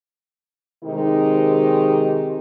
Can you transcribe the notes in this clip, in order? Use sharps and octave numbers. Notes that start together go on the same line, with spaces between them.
C3 D#3 G#3 D#4 G4